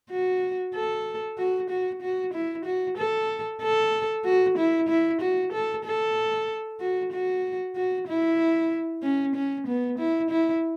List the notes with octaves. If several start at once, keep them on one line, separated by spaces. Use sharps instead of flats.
F#4
A4
F#4
F#4
F#4
E4
F#4
A4
A4
F#4
E4
E4
F#4
A4
A4
F#4
F#4
F#4
E4
C#4
C#4
B3
E4
E4